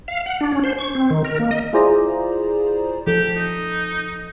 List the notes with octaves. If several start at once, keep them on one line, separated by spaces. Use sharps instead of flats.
F5
F#5
D4
C#4
C5
C#6
C4
D#3
A#4
A#3
D#5
E4 F4 G#4 C5 D5 A#5
F3 G4 A4
D#4